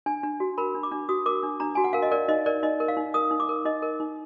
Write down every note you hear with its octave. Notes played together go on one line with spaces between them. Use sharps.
D4 G#5
D4
F#4
A#4 B5
D4
D6
D4
F#4 D#6
A#4 D6
D4
D4 A#5
F#4 G#5
F#5
A#4 F5
D#5
A#4 D5
D#4 D#5
A#4 D5
D#4 D#5
A#4
F5
D#4
A#4 D#6
D#4
D6
A#4
D#4 D#5
A#4
D#4